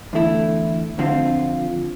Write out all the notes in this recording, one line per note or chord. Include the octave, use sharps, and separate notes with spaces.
E2 D3 A3 E4
F2 D3 F3 C4 F4